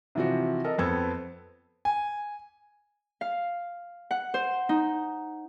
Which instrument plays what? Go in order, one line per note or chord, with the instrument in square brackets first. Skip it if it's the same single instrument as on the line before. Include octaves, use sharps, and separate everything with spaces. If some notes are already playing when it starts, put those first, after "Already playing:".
[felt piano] C3 E3 F3 C4 F#4
A4 A#4 D#5
F2 B3 C4 A4 G#6
[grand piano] G#5
[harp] F5
F#5
C5
D#4